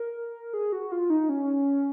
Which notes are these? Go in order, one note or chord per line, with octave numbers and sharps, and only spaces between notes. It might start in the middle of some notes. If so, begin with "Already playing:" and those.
Already playing: A#4
G#4
F#4
F4
D#4
C#4